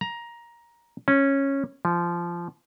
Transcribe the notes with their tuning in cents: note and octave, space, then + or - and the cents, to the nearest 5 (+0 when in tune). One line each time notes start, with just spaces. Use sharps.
A#5 +15
C#4 -10
F3 -15